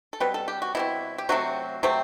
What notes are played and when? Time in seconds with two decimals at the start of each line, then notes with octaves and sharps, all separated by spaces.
0.13 A4
0.20 B2 G3 C4 B4
0.34 A4
0.48 G4
0.62 F#4
0.75 B2 G3 C4 E4
1.18 G4
1.29 C3 F#3 A3 C4 F#4
1.83 C3 F#3 A3 C4